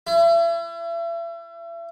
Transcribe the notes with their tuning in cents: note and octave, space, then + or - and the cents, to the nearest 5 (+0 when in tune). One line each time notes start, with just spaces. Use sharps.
E4 +40